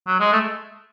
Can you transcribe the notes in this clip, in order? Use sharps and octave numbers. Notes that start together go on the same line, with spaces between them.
F#3
G#3
A3